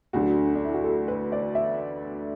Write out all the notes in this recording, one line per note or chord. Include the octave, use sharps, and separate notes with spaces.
D2 D3 F#3 F#4
D4
E4
F#4
A4
B4
D5
E5